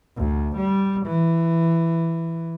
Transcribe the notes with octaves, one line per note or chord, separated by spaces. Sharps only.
D2
G3
E3